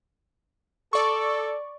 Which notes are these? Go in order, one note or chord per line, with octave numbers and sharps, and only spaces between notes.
A4 D5 C#6